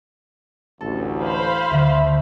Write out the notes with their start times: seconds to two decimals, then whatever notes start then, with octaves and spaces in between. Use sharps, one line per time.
0.81 A1 D2 A4
1.21 C5 F5 B5
1.71 D2 D3 E5